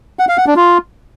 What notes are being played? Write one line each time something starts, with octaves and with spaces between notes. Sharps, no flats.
F#5
F5
F#5
D4
F4